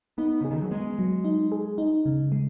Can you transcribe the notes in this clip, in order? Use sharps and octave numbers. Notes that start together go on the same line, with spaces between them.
B3 D#4
C#3 G#4
D#3
F#3
G#3 B3
F#3
D#4
G#4
D#4
C#3
G#3